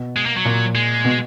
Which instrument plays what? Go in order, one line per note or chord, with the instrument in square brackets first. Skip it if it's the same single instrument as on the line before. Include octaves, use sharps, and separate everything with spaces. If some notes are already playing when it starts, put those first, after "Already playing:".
Already playing: [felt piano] B2
[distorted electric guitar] G#3
A#3
F#3
[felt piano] A#2
[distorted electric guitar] G#3
[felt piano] B2